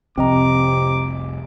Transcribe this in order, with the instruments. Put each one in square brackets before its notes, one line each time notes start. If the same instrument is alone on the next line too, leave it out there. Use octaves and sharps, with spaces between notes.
[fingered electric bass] F1 C2 F3 [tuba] C3 [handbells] C4 D#5 A#5 [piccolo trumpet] D6